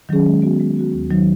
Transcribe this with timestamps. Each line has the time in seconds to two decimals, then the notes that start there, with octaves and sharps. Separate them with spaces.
0.09 D#3 F#3 C#4 G#4
0.26 G#3
0.42 B3 F#4
0.60 G#3
0.76 B3 F#4
0.93 D#2
1.10 D#3 F#3 D#4